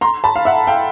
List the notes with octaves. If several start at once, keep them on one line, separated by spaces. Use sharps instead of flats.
A#5 C6
A5 B5
F5
E5 F#5
F5 G5